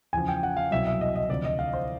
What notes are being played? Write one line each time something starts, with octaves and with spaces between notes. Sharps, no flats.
E2 C#3 F3 G#5
G5
F#5
F5
C2 B2 F#3 E5
E5
D#5
D#5
D2 C3 F3 D5
D#5
F5
C5